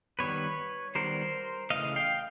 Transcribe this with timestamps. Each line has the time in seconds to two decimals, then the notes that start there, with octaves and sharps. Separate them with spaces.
0.19 D#3 G3 B3 B4 C#5
0.95 D#3 G3 B3 A#4 C5
1.70 C#3 E3 A3 D#5 F5
1.96 F5 G5